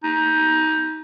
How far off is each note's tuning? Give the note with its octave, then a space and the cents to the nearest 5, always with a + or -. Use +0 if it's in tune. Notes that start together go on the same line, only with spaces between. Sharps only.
D#4 +20